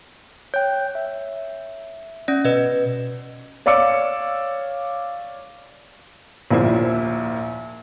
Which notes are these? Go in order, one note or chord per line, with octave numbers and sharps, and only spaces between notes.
C#5 G5 G6
E5
C#4 D5
B2 B4 D#5
C#5 D5 F5 D6 E6 C#7
A#1 D#2 A#2 E4 C5 E5